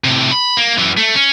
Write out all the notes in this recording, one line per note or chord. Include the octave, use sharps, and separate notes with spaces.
A2 C3
B5
A#3
F#2 E3
A3
C#4